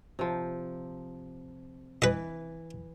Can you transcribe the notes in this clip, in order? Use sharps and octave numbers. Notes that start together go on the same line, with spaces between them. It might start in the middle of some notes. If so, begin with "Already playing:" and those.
C3 F3
E3 B4 D#5